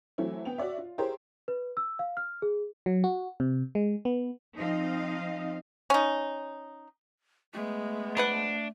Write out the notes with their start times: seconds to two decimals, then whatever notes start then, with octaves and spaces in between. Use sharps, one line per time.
0.18 E3 F#3 A3 C4 E4
0.45 B3 G5 F7
0.58 F#4 C#5 D5 E5
0.78 F4
0.98 E4 G4 G#4 A#4 C5 C#5
1.48 B4
1.77 E6
1.99 F5
2.17 F6
2.42 G#4
2.86 F#3
3.04 F#4
3.40 C3
3.75 G#3
4.05 B3
4.56 F3 C4 D#4 D#5 F5
5.90 C#4 D#4
7.54 G#3 A3 B3
8.17 F3 D4 B4 F#5